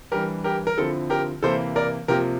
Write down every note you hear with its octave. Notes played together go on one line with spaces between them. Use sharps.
E3 G3 D4 G4 A#4
G4 A#4
A#4
D3 F3 C4 E4 A4
G4 A#4
C3 E3 A#3 E4 A4 C5
A#4 D5
C3 F3 A#3 G4 A#4